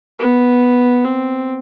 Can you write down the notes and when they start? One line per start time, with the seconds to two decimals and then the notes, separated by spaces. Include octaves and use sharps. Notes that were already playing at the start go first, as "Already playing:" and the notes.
0.19 B3
1.05 C4